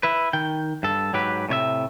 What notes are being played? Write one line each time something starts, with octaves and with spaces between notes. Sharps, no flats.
E4 B4
D#3 G5
G2 A4
G#2 F#3 G4 B4
A2 C3 C#5 E5